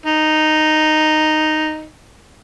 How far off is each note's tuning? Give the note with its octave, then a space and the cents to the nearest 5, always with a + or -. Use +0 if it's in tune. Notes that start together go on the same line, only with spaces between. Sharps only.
D#4 -5